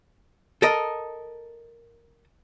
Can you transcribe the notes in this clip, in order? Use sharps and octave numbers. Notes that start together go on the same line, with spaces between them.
A4 A#4 D#5